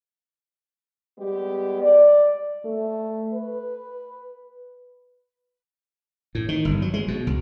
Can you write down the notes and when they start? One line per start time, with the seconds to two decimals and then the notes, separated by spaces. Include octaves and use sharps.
1.17 G3 G#3 B3 G4
1.82 D5
2.65 A3
3.33 B4
6.35 A2
6.49 D#3
6.65 G1
6.82 F#3
6.94 G#3
7.08 B2
7.27 C#2